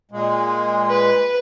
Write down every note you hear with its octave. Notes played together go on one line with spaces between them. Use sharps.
A#2 G#3
B4